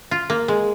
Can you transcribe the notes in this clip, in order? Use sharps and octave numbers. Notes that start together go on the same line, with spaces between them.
F4
A#3
G#3